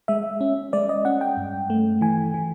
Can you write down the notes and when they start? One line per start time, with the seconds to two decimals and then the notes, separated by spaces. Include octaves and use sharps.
0.08 G#3 E5
0.41 C#4
0.73 G#3 D5
0.89 D#5
1.05 C#4 F#5
1.21 G5
1.37 G2
1.70 A3
2.01 E3 G#5
2.34 E3